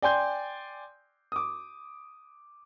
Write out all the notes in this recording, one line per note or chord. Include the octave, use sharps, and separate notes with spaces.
D5 G5 G#5 C6 G6
D6 D#6